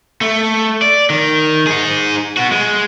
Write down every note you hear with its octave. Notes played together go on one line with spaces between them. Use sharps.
A3
D5
D#3
D#4 G#4
B3 F#4
G#3